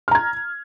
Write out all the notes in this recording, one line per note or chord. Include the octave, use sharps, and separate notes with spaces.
A#5 F6 G#6